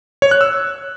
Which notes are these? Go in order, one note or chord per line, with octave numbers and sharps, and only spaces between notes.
C#5
F#6
E6